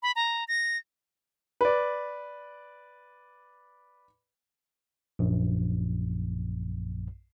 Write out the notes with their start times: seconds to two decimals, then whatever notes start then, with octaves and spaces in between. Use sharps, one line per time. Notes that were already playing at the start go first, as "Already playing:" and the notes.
0.02 B5
0.16 A#5
0.48 A#6
1.61 B4 D5
5.19 A#1 F#2